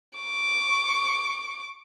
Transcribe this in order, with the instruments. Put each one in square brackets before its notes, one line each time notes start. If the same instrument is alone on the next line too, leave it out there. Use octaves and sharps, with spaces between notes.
[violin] C#6 D6